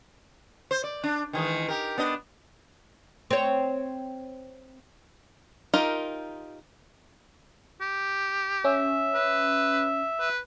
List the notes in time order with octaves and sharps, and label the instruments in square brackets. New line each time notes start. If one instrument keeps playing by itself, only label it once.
[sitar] C5
D5
D4
D#3 E3 G#3
G4 A#4
B3 D4 D#5
[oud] C4 C#5
[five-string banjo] D#4 F4 G4 A#4
[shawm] G4
[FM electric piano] C#4 [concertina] E5
[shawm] B4
B4